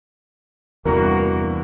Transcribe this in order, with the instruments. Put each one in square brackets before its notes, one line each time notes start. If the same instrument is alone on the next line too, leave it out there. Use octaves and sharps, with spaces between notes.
[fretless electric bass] E2 G3 [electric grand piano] G2 C3 E3 [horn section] A#3 F#4 [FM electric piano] A#4